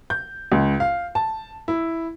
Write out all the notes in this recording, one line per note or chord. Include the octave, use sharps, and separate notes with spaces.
G6
C#2
F5
A5
E4